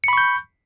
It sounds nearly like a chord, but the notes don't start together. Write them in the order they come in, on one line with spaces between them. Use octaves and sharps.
C#7 B5 C#6 G6